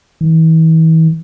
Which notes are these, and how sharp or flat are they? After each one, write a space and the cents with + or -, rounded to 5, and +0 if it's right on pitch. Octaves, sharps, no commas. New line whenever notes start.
E3 -40